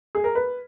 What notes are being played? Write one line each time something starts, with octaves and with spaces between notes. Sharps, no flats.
G#4
A#4
B4